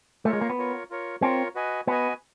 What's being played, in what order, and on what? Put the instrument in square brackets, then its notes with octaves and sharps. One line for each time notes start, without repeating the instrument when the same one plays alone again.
[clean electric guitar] A3 [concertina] F4 A#4 C#5
[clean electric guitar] G#3
A#3
B3
[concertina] F4 A#4 C#5
F4 A#4 C#5
[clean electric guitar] C4 [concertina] F4 A#4 C#5
[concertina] F#4 B4 D#5 G#5
[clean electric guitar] B3 [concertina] F#4 B4 D#5 G#5